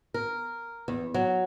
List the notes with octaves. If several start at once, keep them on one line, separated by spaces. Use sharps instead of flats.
A#4
E2
F#3